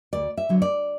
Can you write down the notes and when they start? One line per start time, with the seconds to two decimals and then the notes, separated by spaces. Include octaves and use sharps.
0.13 D2 D5
0.37 E5
0.49 D3 F#3
0.62 D5